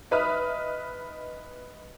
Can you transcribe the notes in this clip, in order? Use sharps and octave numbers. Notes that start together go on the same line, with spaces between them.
D#4 B4 E5 D#6 F6